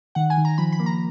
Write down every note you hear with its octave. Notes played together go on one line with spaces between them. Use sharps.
D#3 F#5
G#5
D#3
A#5
F3 B5
B5
A#3
A#5